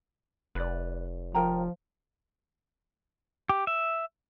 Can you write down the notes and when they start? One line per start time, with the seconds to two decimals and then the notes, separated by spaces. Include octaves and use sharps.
0.55 F1 B4 D5
1.35 F3 A#4 G5 A#5
3.49 G4
3.67 E5